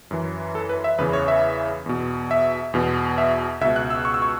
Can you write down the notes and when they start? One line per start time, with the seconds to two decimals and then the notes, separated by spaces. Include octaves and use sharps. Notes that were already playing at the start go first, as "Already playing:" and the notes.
0.11 F#2 E3
0.55 A4
0.69 B4
0.84 E5
0.99 E2 C#3 E3 B4
1.13 C#5
1.28 E5
1.86 E2 B2
2.31 E5
2.74 E2 B2
3.18 E5
3.61 C#2 E5
3.65 B2
3.76 F#6
3.90 E6
4.05 C#6
4.14 E6
4.22 C#6